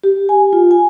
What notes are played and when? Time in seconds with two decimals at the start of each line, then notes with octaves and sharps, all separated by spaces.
0.04 G4
0.29 G#5
0.53 F4
0.71 G#5